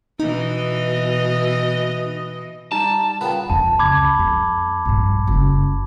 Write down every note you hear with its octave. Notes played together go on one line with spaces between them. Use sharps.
B2 E3 D#4 D#5
G3 D#4 A5 A#5 E7
A#2 C#3 B3 G5 B5
F2 D3 A5
C#2 B5 D6 G#6
F2
A#1 G2
F#1